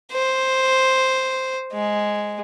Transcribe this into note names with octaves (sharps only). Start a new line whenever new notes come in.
C5
G#3